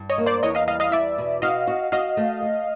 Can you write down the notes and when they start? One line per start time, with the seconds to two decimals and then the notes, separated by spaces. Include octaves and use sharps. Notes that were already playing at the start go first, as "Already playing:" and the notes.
Already playing: G2
0.10 C#5 D#5
0.18 A#3
0.26 C5 D5
0.43 E2 C#5 D#5
0.55 D#5 F5
0.67 G3 D#5 F5
0.80 D#5 F5
0.92 E2 D5 E5
1.18 B2
1.42 F#4 D#5 F5
1.67 F#4
1.92 F#4 D#5 F5
2.17 A3
2.42 A3